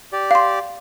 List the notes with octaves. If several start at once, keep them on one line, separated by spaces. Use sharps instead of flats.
G4 D5
F5 C6